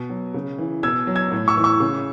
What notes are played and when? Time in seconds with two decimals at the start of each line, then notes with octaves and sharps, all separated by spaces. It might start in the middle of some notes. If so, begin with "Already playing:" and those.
Already playing: B2
0.10 F#3
0.34 C#3
0.58 E3
0.83 B2 E6 G#6
1.07 F#3
1.15 E6 G#6
1.32 A2
1.48 C#6 E6
1.57 E3
1.64 C#6 E6
1.80 C#3